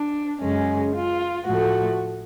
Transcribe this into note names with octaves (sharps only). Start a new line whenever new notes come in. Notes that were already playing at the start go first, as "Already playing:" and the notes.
Already playing: D4
F#2 C#3 G#3 C#4
F4
A2 F3 A3 F#4